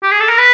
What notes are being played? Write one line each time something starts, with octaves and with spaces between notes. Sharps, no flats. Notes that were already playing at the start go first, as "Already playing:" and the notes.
G4
G#4
A4
A#4
B4